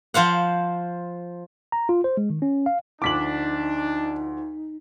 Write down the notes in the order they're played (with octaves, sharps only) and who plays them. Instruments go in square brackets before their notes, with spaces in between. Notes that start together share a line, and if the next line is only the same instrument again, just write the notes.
[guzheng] F3 C5 F5 F#5
[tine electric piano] A#5
F4
C5
G#3
D#3
C#4
F5
[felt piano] D2 F3 [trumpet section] D4 [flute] D#4 [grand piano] D6 B6 F#7